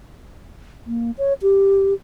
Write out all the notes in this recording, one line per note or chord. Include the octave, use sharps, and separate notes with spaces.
A#3
C#5
G4